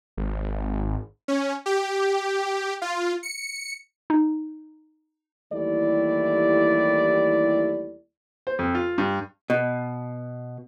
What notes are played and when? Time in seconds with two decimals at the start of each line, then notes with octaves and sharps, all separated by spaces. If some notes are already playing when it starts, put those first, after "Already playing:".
0.17 G#1
1.28 C#4
1.66 G4
2.82 F4
3.23 C#7
4.10 D#4
5.53 D#2 E3 G3 A3 E4 D5
8.47 C5
8.59 F2
8.75 F4
8.98 G2
9.50 B2